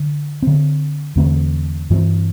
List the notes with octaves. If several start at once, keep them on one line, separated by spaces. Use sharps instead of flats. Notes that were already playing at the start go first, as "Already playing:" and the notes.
Already playing: D3
D3 C4
E2 D3 A3 C4
G2 E3 A3 C4